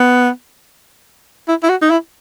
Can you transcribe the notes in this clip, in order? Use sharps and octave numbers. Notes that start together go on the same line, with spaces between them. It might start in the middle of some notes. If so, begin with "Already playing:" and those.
Already playing: B3
E4
E4
F#4
D#4
E4